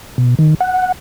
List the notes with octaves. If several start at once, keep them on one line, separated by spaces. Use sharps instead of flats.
B2
D#3
F#5